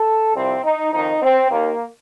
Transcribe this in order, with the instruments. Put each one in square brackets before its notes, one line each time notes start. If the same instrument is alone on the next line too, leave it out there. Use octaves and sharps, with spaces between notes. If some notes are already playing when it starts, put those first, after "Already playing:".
Already playing: [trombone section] A4
C2 C3 F3 C4
D#4
F2 D#3 D#4
C4
D#2 D#3 A#3